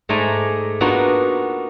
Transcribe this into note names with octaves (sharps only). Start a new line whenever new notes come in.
G#2 G#3 A3 D5 G#5 A#5
A#3 B3 D4 D#4 F4 F#4